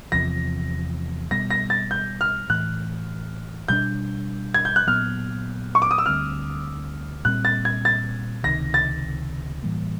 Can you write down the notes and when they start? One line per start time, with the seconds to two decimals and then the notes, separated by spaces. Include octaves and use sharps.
0.12 E2 C3 F3 A#6
1.31 B2 G3 B3 A#6
1.50 A#6
1.70 A6
1.91 G6
2.21 F6
2.49 A2 E3 A3 F#6
3.68 B2 G3 A#3 D4 G6
4.54 G#6
4.65 G6
4.76 F#6
4.87 A#2 F#3 B3 F6
5.75 C#6
5.82 D6
5.91 D#6
5.98 E6
6.06 D2 D3 G3 C4 F6
7.25 A#2 G3 C4 F#6
7.45 A6
7.65 G#6
7.85 A6
8.44 C#2 C3 D#3 A#6
8.74 A6
9.63 A2 E3 G3 A#3